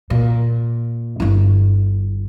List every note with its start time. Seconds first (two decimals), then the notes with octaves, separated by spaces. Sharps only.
0.10 A#2
1.20 G1 E4